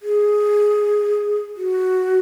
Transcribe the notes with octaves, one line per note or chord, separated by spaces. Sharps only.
G#4
F#4